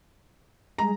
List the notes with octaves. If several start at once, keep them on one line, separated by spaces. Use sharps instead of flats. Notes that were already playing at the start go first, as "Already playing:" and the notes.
G3 G#3 G#4 A#5